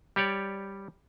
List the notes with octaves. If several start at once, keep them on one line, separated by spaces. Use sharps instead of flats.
G3 G4 C#5 D5